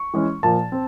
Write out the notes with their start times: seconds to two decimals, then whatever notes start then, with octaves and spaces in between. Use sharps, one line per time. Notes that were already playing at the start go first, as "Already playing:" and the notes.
Already playing: C#6
0.14 E3 G#3 C#4
0.43 A#2 F3 A#3 A5
0.72 C4